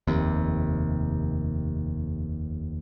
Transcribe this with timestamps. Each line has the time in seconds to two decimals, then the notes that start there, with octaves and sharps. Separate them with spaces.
0.07 F1 D#2 C3